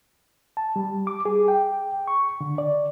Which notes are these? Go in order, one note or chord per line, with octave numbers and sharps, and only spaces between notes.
A5
G3
D6
G#4
G5
C#6
D3
D5